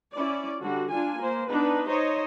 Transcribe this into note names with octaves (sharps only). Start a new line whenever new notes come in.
C#4 E4 D5
D3 G3 F#4
D4 F4 G#5
A#3 C5
B3 D4 D#4 B4
D#4 C5 C#5 D#5